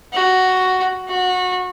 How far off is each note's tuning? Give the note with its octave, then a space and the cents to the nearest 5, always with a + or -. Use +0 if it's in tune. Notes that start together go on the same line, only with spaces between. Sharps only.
F#4 +5
F#4 -20